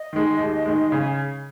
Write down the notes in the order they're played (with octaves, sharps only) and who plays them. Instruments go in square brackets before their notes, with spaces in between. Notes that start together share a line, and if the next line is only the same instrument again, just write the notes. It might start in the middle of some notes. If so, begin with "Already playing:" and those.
Already playing: [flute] D#5
[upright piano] D#3 G#3
D#2
D#3 G#3
[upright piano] C#3 [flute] G#5